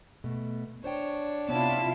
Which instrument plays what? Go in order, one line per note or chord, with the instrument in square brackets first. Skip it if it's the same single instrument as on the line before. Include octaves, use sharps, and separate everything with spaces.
[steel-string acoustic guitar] B2 A3
[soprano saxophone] D4 [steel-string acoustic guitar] C5 G5 [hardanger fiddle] C#5
[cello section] C3 E4 F4 [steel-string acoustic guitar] B3 C#5 D5 [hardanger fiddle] A5